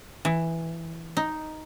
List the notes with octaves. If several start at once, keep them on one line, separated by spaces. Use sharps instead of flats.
E3
D#4